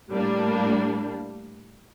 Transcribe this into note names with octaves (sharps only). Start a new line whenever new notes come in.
A2 G3 A#3 D4